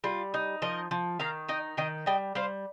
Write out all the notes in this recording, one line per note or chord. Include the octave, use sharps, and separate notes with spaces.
G3 F4
D#4
F3 A#4 D#5
F3
D#3 F5 A#5
D#4 D#5 G5
D#3 D#5 G5
G3 D#5 G5
G3 C5 F5